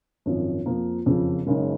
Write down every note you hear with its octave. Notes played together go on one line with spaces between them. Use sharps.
G#1 F#2 F3
F2 F3 A#3
F#1 F2 C#3 F3
F#1 F#2 C#3 G#3 D#4